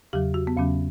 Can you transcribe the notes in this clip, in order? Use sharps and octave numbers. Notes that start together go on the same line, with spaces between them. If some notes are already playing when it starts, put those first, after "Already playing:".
E2 C#3 F#3 G4
F#4
B3
E2 C#3 F#3 C#4